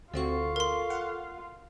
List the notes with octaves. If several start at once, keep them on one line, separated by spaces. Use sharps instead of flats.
D2 C4 F4 F#4 A4 C#6
A#4 C6
F#5